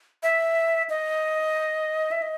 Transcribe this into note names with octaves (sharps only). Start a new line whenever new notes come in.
E5
D#5
E5
D#5